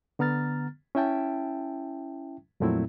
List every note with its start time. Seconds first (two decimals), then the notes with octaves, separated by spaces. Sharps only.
0.19 D3 B3 A#5 F6 A6
0.95 C#4 E4 E5 G5 A5
2.60 F2 A#2 F#3 A3 C4 E4